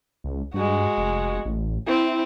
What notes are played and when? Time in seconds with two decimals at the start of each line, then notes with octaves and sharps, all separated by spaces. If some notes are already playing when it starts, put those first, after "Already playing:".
0.24 C#2
0.54 G2 G#3 F#4
0.98 F1
1.46 A1
1.87 C4 E4